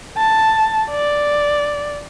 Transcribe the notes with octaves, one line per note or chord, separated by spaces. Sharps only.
A5
D5